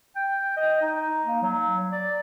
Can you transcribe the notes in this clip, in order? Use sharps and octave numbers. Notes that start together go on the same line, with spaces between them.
G5
D#5
D#4
A#3
F#3
D5